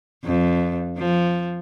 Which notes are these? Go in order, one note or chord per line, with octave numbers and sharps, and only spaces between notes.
F2
F3